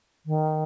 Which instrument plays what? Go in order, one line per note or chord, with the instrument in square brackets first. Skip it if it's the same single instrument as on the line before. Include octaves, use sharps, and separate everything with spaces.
[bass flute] D#3